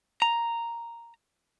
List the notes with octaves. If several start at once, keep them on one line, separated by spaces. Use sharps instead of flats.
A#5